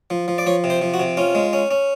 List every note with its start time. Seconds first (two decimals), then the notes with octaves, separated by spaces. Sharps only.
0.10 F3
0.28 F3
0.38 D5
0.46 F3 C#5
0.64 C3
0.70 C5
0.81 F3
0.94 F#4
0.99 C3
1.17 C#4 F4
1.35 G#3
1.53 C#4
1.71 C#4